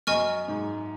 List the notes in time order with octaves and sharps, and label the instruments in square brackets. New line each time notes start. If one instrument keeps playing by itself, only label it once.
[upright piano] F#2 [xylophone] D#5 G#5 C#6 F6
[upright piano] G#2